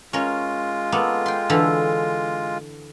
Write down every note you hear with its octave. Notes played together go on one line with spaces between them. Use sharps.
G#3 C#4 F4 A#4
A#3 B3 A4
G5 C6
D3 E3 A4